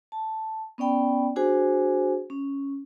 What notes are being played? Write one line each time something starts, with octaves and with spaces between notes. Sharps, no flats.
A5
B3 C#4 D5 G5 B5
D4 F#4 G#4 C5 G#5
C#4